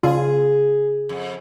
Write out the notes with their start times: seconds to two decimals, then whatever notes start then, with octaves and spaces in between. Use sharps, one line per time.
0.03 C#3 F4 G#4
1.09 F2